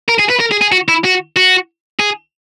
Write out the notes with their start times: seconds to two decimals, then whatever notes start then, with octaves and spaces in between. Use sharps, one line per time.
0.09 A#4
0.19 G#4
0.30 B4
0.40 A#4
0.52 G#4
0.62 G#4
0.72 F#4
0.89 E4
1.04 F#4
1.36 F#4
2.00 G#4